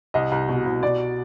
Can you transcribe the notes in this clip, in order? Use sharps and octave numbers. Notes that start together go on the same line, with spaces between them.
C2 D#5
C2
B2
C2
B2 D5